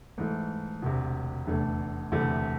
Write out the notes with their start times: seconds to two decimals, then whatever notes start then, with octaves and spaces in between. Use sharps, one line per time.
0.18 G#2 E3 A3
0.82 E1 D2 C3
1.47 F1 E2 D3 A3
2.12 E1 D2 C3 E3 A3